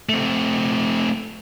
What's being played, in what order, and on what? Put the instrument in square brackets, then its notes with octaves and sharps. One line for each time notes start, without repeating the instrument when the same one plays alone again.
[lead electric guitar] A3 C4